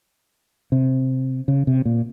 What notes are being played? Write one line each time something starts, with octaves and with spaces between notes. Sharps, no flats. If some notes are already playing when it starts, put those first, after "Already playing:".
C3
C#3
C3
A#2